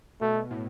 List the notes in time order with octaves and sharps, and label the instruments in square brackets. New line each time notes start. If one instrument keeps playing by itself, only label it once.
[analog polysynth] B2 [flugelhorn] A3
[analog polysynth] A2